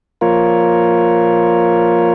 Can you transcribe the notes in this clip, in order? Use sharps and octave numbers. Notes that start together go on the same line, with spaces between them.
F3 A#3 F4 A#4 C#5